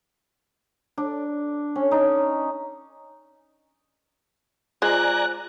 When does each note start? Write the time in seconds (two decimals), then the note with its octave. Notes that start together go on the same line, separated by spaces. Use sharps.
0.98 D4
1.76 C#4
1.91 D#4
4.82 G#3 F4 C5 D5 G#5 A#5 F#6